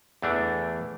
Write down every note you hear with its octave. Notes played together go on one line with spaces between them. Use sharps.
E2 E3 A3 D4